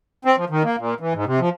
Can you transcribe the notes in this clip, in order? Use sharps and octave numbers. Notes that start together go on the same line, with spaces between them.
C4
F3
D#3
A#3
A#2
E3
G#2
C3
F3